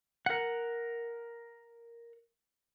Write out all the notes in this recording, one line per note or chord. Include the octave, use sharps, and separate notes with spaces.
A#4 F#5